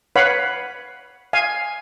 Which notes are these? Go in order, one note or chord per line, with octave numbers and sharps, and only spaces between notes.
B4 C#5 F5 F#5 B5
F5 G#5